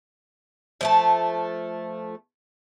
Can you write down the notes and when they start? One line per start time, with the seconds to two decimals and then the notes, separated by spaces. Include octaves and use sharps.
0.81 F3 A3 A5